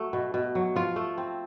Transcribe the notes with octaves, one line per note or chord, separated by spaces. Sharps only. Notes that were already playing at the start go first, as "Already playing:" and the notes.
Already playing: F#3 A3
B2
B2
F#3
F3 F4
A3
C4